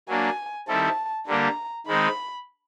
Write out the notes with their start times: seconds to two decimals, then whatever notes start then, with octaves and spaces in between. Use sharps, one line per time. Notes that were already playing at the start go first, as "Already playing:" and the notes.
0.09 F#3 A#3 D4 G#5
0.68 D#3 G3 C4 E4 A4 A5
1.27 D3 G3 A#3 D4 G4 A#5
1.87 D#3 G#3 C4 D#4 B5